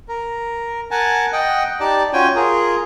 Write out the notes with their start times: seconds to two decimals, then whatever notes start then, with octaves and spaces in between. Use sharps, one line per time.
0.08 A#4
0.91 A#4 F#5 G#5 A5
1.33 D#5 F#5 G5
1.80 D#4 G4 D5 A5
2.13 C#4 F4 F#4 G5 G#5
2.36 F4 G#4 A#4